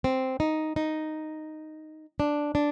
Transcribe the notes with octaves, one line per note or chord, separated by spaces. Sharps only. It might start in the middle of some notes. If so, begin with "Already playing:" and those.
C4
D#4
D#4
D4
D4